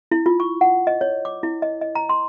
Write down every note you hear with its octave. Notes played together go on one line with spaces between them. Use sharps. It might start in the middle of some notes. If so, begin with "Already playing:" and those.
E4
F4
C#6
F#5
D#5
C#5
D6
E4
D#5
D#5
A#5
C6